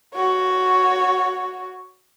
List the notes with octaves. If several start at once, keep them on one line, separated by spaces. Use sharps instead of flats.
F#4 C#5